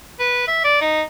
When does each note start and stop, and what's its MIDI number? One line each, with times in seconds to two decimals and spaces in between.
0.20 0.47 71
0.48 0.62 76
0.64 0.78 74
0.81 1.02 63